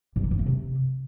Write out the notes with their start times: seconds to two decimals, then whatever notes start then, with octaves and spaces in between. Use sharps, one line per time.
0.16 G2
0.24 D#3
0.31 F#2
0.39 A3
0.46 C3